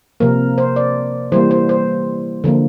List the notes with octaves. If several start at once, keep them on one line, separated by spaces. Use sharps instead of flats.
C3 F3 A#3 A#4
C5
D5
E3 G3 A#3 C5
C5
C5
D3 F3 A#3